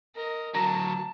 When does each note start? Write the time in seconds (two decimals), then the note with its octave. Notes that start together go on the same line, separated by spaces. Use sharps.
0.15 A#4 D#5
0.55 D3 F#3 A5 A#5 A#6